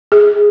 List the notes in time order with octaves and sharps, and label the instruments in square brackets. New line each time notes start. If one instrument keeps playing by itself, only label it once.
[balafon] G#4